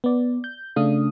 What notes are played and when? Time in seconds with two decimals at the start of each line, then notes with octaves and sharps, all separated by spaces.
0.04 B3 D5
0.44 G6
0.76 C#3 A3 D4 F5 D#6